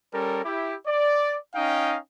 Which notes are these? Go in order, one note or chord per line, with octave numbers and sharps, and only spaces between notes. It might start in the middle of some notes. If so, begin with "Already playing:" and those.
G3 C#4 A4 A#4
E4 G4
D5
C#4 D#4 D#5 F5 G5